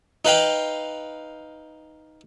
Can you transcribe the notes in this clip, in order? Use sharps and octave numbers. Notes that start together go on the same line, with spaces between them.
D#4 B4 F5 G5